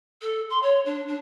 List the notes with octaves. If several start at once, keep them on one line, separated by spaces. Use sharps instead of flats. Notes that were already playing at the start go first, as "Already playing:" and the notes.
A4
C6
C#5
D4
D4